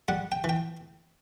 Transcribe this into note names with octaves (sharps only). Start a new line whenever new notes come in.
G3 F#5
G5
E3
G5